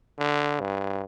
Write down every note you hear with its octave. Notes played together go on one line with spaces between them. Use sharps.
D3
G2